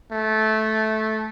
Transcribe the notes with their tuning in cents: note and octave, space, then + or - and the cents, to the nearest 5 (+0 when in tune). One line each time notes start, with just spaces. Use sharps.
A3 -15